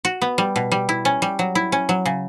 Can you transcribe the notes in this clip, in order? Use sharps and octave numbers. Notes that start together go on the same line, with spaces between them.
F#4
B3
G3
B2
G3
E4
C#4
G3
F#3
E4
C#4
F#3
C#3